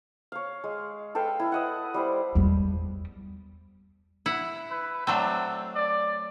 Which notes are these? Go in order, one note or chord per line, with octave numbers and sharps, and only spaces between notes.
C#5 F5
G#3
A4 B4 F5 G5
E4
B4 D#5 F#5
G3 E4 C5
E2 G3
E4 F#5
B4
F#3 A3 C4 D4
D5